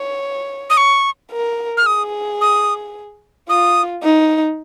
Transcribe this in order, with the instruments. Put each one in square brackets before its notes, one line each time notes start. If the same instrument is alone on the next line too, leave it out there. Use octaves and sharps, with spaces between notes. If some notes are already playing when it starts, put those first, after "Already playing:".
Already playing: [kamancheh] C#5
[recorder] D#6
C#6
[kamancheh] A#4
[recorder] F6
[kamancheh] G#4 [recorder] D#6
[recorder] D#6
[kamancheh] F4 [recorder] D#6
[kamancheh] D#4